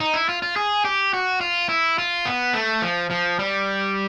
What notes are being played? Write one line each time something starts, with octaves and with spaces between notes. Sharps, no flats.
D#4
E4
F4
F4
G#4
G4
F#4
F4
E4
F4
B3
A3
F3
F3
G3